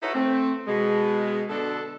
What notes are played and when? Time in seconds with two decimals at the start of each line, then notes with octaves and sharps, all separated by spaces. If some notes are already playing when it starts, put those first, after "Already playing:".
0.03 D#4 E4 F#4 A4 B4 C#5
0.14 A3 C4
0.67 B2 G#3
1.49 B2 D3 D4 A4